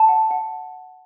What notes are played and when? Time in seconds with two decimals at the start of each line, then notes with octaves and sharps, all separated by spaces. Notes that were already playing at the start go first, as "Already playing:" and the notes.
Already playing: A5
0.08 F#5
0.31 F#5